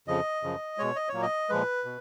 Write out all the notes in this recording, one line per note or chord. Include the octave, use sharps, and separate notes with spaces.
F2 C#3 F3 D#5
F#2 C#3 F3
B2 G#3 C#5
D#5
C#5
A#2 F#3 A#3
D#5
A#2 F3 G#3 B4
B2